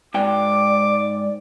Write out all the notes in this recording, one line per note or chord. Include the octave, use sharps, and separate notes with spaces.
G#2 D5 G5 D6